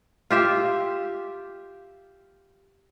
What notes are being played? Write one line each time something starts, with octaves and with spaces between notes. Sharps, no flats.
F4 G4 E5